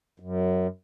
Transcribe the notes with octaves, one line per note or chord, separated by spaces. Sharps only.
F#2